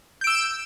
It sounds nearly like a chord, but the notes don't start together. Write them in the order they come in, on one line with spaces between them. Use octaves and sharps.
G6 D7 E6 E7